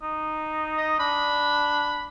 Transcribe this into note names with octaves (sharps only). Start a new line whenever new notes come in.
D#4
D#5
D4 B5